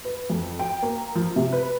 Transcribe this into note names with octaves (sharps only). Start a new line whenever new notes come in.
B4
F2
G5
A#3
F3
C3
B4